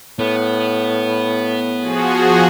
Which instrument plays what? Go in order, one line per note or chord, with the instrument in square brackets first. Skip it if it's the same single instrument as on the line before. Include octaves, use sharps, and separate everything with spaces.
[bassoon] A2 [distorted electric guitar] B3
[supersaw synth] F3 F#4 G#4